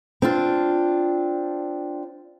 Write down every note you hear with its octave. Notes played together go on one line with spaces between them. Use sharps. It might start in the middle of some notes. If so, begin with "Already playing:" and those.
C4 D4 F4